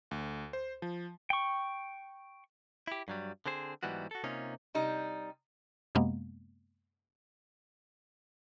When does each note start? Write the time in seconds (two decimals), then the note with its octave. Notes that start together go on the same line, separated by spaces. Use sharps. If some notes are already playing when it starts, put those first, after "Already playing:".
0.11 D2
0.53 C5
0.82 F3
1.30 G5 C#6
2.87 E4 G4
3.08 G2 F#3 G3
3.46 D3 C4 G#4 C5
3.83 G#2 E3 F#3 G3 B3 F#4
4.11 F#4 A4
4.24 C3 A#3 C#4 D#4 F4
4.74 C3 G3 D#4
5.95 F#2 C3 G#3 A#3 B3